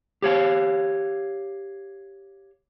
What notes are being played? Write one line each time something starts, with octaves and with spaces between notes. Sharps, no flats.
G4 C#5 F5